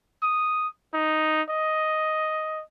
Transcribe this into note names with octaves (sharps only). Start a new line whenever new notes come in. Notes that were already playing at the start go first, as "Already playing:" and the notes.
D#6
D#4
D#5